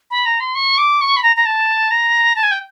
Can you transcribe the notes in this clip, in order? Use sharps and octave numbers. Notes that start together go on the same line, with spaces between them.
B5
A#5
C6
C#6
D6
C#6
B5
A#5
A#5
A5
A#5
A5
G#5
G5